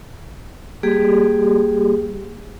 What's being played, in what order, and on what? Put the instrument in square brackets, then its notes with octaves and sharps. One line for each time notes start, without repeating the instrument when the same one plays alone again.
[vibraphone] G3 A#3 G4 G#4